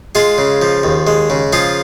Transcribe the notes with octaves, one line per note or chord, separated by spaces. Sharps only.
G#3 F4 G#4
C#3
F3
D#2
G#3
C#3
F3 F4 G#4